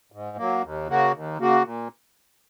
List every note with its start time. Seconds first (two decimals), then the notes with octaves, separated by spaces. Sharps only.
0.12 G#2
0.37 F#3 A#3
0.63 D#2
0.88 C#3 A#3 F#4
1.13 D#2
1.38 C#3 A#3 F#4
1.63 A#2